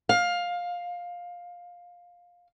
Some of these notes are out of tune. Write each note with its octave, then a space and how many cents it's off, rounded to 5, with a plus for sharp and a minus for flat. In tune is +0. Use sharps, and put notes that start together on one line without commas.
F5 +15